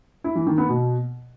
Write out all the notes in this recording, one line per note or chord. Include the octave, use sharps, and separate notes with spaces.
E4
E3
D#3
B3
B2